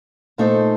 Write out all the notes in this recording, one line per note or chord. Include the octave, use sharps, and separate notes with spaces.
A#2 A3 D#4 A4 C5